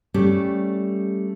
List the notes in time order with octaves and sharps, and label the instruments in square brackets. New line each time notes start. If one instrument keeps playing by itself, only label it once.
[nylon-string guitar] G3 A3 C#4 G4 D5